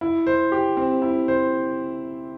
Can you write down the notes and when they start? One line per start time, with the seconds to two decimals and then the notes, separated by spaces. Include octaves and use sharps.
0.01 E4
0.27 C5
0.52 G4
0.77 C4
1.02 E4
1.28 C5